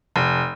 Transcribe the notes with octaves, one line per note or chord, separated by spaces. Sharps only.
F1